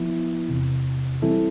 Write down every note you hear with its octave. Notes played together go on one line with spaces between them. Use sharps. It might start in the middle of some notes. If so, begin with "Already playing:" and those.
Already playing: F3 B3 E4
E2 C3 E3
E3 G3 C4 E4 A4